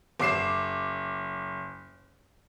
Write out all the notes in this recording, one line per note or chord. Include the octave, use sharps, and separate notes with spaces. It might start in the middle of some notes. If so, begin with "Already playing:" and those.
F#1 D6 C7 E7